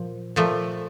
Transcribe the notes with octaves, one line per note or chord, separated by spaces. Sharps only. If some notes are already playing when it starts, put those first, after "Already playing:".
Already playing: A#2 F3
A#2 F3 A3